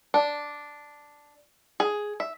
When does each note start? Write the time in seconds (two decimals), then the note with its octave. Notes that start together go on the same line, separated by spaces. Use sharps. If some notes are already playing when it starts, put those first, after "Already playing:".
0.14 D4
1.80 G#4
2.20 E5